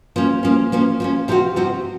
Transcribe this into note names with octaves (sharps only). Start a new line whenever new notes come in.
F3 A#3 C#4
F3 A#3 C#4
F3 A#3 C#4
F3 A#3 C#4
C3 F3 C4 F#4
C3 F3 C4 F#4